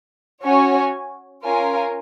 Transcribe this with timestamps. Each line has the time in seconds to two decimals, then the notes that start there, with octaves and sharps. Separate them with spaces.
0.42 C#4 F#4 C#5 G#5
1.43 C#4 F4 A#4 F5 G#5